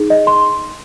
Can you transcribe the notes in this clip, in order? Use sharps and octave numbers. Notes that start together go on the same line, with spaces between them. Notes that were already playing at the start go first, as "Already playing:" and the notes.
Already playing: D#4 G#4
D#5
C6